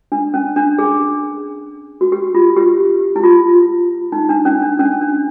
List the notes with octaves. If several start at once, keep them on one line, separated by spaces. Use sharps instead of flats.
D4
C#4
D4
G#4
F#4
G4
F4
G4
E4
F4
D#4
D4
C#4
D4
C#4
D4